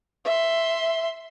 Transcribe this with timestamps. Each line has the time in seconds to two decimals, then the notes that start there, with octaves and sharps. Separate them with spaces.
0.25 E5 C6